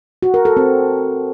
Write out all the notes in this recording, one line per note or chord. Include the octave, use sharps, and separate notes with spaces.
F#4
A#4
A4
C4